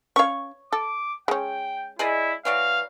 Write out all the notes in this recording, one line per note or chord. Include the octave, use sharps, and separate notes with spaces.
C#4 C#5 F5 C#6
A4 D6
G#3 C#4 G5
E4 G#4 D5 D#5
E3 F#3 D5 F5